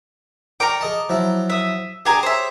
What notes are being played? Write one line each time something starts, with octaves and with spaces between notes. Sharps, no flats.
A#4 D5 G5 A#5 C#6 D6
G#4 D#5 A5
F3 F#3 E4
E5 D#6
D4 G4 G#4 G#5 A#5
C5 C#5 E5